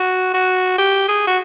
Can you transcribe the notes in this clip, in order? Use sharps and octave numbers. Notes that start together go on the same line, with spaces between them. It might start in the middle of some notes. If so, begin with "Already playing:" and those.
Already playing: F#4
F#4
G4
G#4
F#4